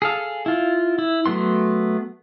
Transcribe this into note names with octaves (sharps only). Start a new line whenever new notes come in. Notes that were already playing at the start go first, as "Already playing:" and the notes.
G#4 A4 F5
E4 F4
E4
F#3 A3 B3 C6